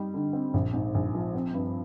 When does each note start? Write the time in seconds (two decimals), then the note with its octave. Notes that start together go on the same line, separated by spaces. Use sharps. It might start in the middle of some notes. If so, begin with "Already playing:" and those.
Already playing: G3 D#4
0.14 D3
0.33 C4
0.54 A#1
0.74 G#2
0.95 A#1
1.14 F3
1.35 C4
1.54 G2